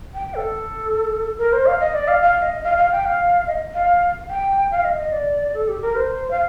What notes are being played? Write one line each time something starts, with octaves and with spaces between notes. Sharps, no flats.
G5
A4
A#4
C5
F5
D#5
D5
F5
F5
D#5
F5
F5
G5
F5
D#5
F5
G5
F5
D#5
D#5
D5
A4
G4
A#4
C5
F5